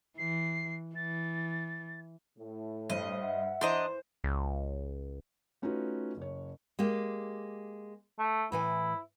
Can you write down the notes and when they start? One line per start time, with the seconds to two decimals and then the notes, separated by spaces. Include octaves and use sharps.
0.18 E3 C7
0.95 E3 A6
2.38 A2
2.90 G2 C5 D#5
3.22 E5 F#5
3.61 E3 D4 C5 D#5 A#5
4.24 C#2
5.62 A3 C#4 D#4 F4 F#4 B4
6.17 F#1 C#5
6.79 G#3 A#3 G4
8.19 A3
8.52 A2 E3 E4 G#5